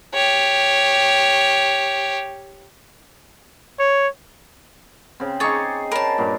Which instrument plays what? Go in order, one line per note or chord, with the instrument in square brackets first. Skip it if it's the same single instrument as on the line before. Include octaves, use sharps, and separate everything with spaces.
[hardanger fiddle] G4 C#5
[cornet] C#5
[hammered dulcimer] C#3 C4
[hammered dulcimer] D#4 G#4 [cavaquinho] C#5 C#6 [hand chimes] D6 A6
[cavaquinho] A#4 A5 [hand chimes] C#5 B5
[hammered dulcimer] G2 A#2